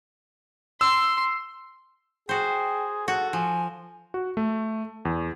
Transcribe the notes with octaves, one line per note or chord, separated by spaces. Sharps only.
C6 E6
F#4 G#4 C5 G5
F#4 A4 F#5
F3 G#5
F#4
A3
E2